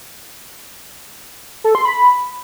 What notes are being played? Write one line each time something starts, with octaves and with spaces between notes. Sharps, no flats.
A4
C6
B5